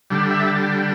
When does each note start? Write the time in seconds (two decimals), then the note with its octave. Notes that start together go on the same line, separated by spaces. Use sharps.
0.10 D3 G3
0.31 E5